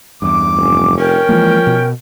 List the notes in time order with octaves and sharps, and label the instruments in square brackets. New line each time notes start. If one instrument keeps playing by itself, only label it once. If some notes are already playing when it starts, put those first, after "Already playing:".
[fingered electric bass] E2 G2 [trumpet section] D6
[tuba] F1 [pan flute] C#4
[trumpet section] C#4 G5 [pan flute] A#4
[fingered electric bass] E3 G#3 A#3 [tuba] F3
[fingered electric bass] B2